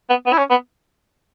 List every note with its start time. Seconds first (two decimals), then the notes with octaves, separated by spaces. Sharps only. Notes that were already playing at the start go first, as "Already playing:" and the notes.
0.09 B3
0.26 B3
0.32 E4
0.38 C#4
0.50 B3